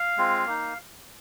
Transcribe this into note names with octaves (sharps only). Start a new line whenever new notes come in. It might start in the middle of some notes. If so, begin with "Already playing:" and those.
Already playing: F5
G#3 C4 F4
A#3 D#4